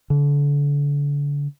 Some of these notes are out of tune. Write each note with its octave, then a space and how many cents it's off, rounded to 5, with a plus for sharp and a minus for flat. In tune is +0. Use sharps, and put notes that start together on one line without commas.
D3 -35